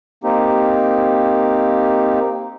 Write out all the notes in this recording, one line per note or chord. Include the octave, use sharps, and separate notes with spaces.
A#3 C4 D#4 G4